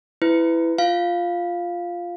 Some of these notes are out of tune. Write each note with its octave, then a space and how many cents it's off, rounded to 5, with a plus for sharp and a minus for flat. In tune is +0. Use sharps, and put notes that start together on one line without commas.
E4 +5 B4 +20
F4 +0 F5 +0